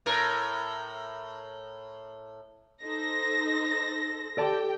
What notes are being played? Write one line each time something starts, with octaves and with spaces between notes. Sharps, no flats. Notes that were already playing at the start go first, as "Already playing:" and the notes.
A2 A#4
D#4 A4 C5 A#6
G4 A4 D5 G5 A5